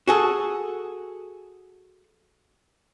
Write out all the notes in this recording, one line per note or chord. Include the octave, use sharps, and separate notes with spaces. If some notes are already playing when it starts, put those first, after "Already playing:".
F#4 G#4 A4